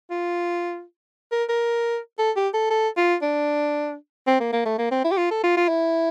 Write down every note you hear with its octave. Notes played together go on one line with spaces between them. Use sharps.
F4
A#4
A#4
A4
G4
A4
A4
F4
D4
C4
A#3
A#3
A3
A#3
C4
E4
G4
F4
A4
F4
F4
E4